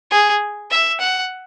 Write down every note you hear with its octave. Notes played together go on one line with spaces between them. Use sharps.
G#4
E5
F#5